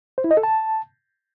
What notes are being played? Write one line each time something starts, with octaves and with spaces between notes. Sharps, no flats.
C5
E4
D#5
A4
A5